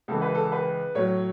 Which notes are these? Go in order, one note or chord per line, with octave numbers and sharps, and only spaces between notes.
C#2 C#3 E3 A4
B4
A4
B4
A2 F#3 C#5